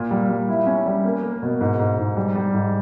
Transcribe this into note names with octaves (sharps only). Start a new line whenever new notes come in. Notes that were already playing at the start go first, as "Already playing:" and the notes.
Already playing: A#2
G3
G3
E4
C#4
G3
A#3
A#3
B2
G#2
G#2
G#2
G3
G3
G#2